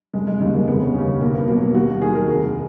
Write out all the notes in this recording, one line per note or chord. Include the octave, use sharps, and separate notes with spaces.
F1 G#3
G#3
D#2 C#3 G#3
A#3
F1 B3
C#4
D#2 C#3 C#4
B3
B1 A#3
B3
B2 F#3 A#3
A#3
D#2 F#4
D#3 F#3 G#4
A#4
F1